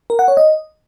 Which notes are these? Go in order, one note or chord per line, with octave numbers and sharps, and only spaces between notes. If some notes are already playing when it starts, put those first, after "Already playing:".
A#4
F#5
C#5
D#5